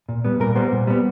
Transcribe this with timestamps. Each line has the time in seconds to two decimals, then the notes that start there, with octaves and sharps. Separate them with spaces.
0.09 A#2
0.25 G3 B3
0.40 A#2 A#4
0.55 G3 B3 C5
0.72 A#2
0.87 G3 B3